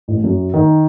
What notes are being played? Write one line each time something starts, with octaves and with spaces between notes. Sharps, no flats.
A1
F#2
D#3